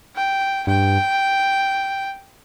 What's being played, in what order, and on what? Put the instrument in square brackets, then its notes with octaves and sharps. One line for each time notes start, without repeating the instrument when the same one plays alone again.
[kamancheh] G5
[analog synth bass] G2 [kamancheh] G5